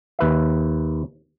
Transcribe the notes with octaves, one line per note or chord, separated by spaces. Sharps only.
D#2 B4 E5